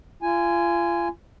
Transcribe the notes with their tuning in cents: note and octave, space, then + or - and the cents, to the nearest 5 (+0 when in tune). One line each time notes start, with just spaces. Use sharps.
F4 -35 G#5 +0